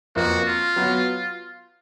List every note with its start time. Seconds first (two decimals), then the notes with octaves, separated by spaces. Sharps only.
0.16 F2 F3 A#3 F4 F#4
0.46 F4
0.76 F#3 B3 F#4